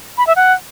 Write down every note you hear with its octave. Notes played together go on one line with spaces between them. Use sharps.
B5
E5
F#5